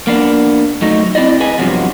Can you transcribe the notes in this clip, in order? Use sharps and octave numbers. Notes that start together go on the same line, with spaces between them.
A#3 B3 D4
F#3 A3 D#4
C4 E4 D5 D#5
G#4 B4 D#5 G#5
G2 C3 F3 F#3 B3